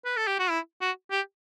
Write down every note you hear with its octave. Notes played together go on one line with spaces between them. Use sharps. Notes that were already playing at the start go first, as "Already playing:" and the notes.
B4
A4
G4
F#4
E4
F#4
G4